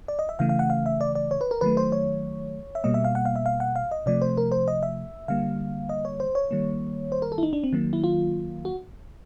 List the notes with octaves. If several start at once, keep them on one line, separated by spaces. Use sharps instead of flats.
D5
D#5
E5
C#3 E3 A3 F5
F5
F#5
F5
E5
D5
D5
C#5
B4
A#4
D#3 F#3 A3 B4
C5
C#5
E5
B2 G3 A#3 D#5
E5
F5
F#5
F5
E5
F5
F#5
F5
D#5
C3 F3 A3 D5
C5
A#4
C5
D#5
E5
D3 G3 A#3 F5
D#5
C#5
C5
C#5
D#3 G3 A#3
C5
A#4
A4
E4
D#4
D4
C4
D#3 F#3 A#3
E4
F4
F#4